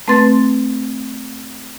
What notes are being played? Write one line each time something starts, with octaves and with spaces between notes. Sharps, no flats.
A3 C4 B4 C6 A6